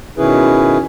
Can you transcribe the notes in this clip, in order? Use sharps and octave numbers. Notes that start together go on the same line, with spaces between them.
B2 D#3 C#4 E4 G#4 B4